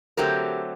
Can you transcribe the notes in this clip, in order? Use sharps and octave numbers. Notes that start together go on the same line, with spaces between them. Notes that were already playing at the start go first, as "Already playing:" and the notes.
D3 F#3 A3 C4 G4 A#4